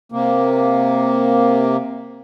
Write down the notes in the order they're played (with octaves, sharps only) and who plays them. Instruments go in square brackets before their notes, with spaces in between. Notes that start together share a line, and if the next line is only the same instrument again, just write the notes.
[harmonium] C3 A#3